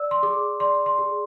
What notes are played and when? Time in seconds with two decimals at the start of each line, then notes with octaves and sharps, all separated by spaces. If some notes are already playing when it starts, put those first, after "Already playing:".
Already playing: D5 E6
0.11 C6
0.23 G#4 D6
0.60 D5 C6
0.86 C6
0.98 G#4